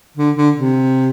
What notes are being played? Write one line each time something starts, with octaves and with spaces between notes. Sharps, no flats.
D3
D3
C3